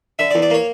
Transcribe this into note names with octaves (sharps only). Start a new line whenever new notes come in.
D3 E5
D5
E2
D5
A#3 C#5